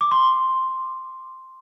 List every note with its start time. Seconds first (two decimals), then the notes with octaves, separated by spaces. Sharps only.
0.01 D6
0.11 C6